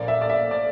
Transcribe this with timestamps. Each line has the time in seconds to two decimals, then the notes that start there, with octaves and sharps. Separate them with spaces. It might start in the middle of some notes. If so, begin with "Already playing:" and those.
Already playing: A#1 A#2 A#3 D5
0.08 E5
0.22 D5
0.29 E5
0.51 D5